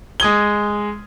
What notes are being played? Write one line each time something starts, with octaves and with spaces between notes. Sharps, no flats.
G#3 D#6 G#6 G7